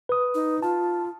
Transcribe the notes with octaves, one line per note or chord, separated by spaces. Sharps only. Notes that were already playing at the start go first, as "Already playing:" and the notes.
B4 D#6
D#4
F4 A5